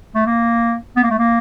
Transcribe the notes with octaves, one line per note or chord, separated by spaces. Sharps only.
A3
A#3
B3
A#3
A3
A#3